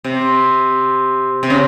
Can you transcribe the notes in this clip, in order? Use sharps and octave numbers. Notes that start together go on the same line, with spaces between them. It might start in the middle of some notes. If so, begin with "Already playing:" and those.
C3
C3
C#3